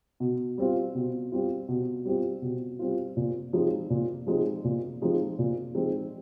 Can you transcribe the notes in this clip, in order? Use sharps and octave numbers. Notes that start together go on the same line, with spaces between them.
B2
G3 C4 F4
B2
G3 C4 F4
B2
G3 C4 F4
B2
G3 C4 F4
A#2
F3 G#3 C4 D#4
A#2
F3 G#3 C4 D#4
A#2
F3 G#3 C4 D#4
A#2
F3 G#3 C4 D#4